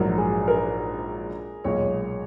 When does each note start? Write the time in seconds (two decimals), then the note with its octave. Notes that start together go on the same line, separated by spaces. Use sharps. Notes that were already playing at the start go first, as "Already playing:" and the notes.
Already playing: A#1 G#2 F#3 A#4
0.18 G#4
0.48 A#4
1.64 B1 A#2 G#3 C#5